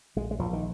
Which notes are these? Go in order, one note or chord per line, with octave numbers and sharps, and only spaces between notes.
A#1 G#3
G#3
A#1 F3
D#3